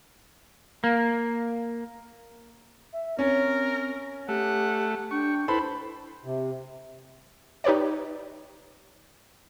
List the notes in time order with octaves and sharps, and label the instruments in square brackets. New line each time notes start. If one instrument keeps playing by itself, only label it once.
[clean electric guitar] A#3
[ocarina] E5
[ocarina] C4 [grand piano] C#4 [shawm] A#4
[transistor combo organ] A3 [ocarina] G4 [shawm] F#5
[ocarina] D4 [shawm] G5 [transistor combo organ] C#6
[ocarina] E4 [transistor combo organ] A4 B4 C5 [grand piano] B5
[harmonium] C3
[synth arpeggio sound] D#4 G4 B4 C#5 D5